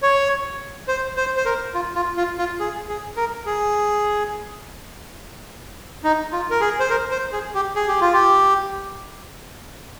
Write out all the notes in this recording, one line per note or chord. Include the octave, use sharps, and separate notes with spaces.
C#5
C5
C5
C5
A#4
F4
F4
F4
F4
G#4
G#4
A#4
G#4
D#4
F4
A#4
G#4
C5
A#4
C5
G#4
G4
G#4
G4
F4
G4